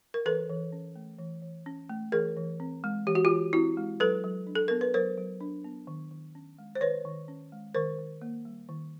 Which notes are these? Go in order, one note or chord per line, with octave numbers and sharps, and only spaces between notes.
A#4
E3 A4 B4
E3
C#4
A3
E3
E3
C#4
A3
E3 G#4 A#4
E3
C4
G#3
E3 G4
F#4
F4 G4
E3
C4 E4 F#4
G#3
F#3 A4 B4
F#3
D4
A4
B3 A#4
B4
F#3 A#4 C5
F#3
D4
B3
D#3
D#3
C#4
G#3
C5
D#3 B4 C#5
D#3
C#4
G#3
D#3 A#4 C5
D#3
A#3
G3
D#3